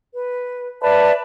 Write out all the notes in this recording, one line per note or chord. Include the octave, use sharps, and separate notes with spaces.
B4
B4 D5 E5 A5